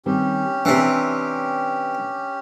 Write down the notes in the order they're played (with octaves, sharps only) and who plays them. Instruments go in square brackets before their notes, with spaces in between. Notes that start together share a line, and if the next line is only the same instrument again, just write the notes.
[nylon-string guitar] D#3 G3 C4 [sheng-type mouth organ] C#4 G4
[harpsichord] C3 E3 [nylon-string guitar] D4